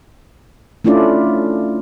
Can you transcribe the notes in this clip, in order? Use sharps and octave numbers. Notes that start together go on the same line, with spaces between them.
A3 C#4 D4 E4 F4 D5